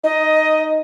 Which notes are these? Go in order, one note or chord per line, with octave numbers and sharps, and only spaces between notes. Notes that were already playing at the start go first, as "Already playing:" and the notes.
D#4 D#5